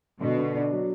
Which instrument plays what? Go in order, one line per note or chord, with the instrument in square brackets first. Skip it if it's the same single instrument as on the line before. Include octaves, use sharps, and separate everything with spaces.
[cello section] B2 [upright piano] D3
[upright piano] D3
D4
F#3